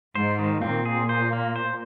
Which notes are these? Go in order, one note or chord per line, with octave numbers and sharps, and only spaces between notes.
G#2 C5
D#3
A#2 C4
G#4
C5
A#3
C5